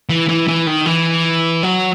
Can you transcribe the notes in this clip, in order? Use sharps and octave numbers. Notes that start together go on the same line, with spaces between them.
E3
E3
E3
D#3
E3
F#3